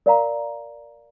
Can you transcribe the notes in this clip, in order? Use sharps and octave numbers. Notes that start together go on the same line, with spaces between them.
A#4 D5 F5 A#5